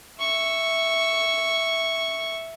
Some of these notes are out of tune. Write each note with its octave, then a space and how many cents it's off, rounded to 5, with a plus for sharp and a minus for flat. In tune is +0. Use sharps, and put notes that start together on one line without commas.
E5 +0 C#6 +0